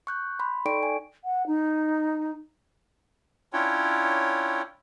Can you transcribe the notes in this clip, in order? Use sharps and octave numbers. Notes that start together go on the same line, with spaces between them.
C#6 F#6 G6
B5 C6
D#4 A4 D5 G5 C#6 D7
G#5
F#5
D#4
C#4 D4 E4 F4 C#5 G5